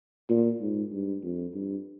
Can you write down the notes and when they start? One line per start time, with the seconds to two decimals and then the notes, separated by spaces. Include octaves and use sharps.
0.29 A#2
0.61 G#2
0.92 G2
1.23 F2
1.54 G2